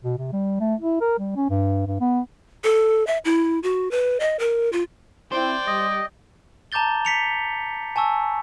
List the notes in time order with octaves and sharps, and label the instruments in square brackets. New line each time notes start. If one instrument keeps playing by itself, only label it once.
[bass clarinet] B2
C3
G3
A3
E4
A#4
G3
C#4
G2
G2
B3
[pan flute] A4
E5
E4
F#4
B4
D#5
A#4
F4
[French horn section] C4 E4 [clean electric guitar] C5 [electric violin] D5 G5
[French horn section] G3 [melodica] D#5
[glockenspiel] A5 A#5 D6 G6 A6 G7
B6 C#7 F7
G#5 A5 C#6 E6